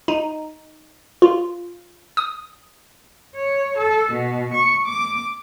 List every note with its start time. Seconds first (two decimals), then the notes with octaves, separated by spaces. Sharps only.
0.08 D#4
1.22 F4
2.17 D#6
3.36 C#5
3.78 A4
4.13 B2
4.54 C#6
4.85 D6